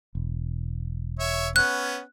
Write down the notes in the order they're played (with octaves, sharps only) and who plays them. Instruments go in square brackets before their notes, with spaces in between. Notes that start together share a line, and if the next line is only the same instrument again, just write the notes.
[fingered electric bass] E1
[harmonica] C#5 E5
[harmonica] B3 C#4 [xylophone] F#6